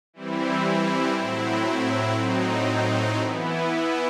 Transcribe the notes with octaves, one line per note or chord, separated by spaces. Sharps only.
E3 G3 C4 E4
A2 F#3 C4 E4
A2 F#3 C4 D#4
E3 B3 E4